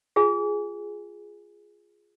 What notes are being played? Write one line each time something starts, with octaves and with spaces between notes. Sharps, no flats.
F4 G#4 G#5